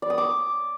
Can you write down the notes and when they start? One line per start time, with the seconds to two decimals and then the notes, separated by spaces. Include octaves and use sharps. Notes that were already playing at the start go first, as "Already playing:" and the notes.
0.02 D5
0.10 D#6
0.18 D6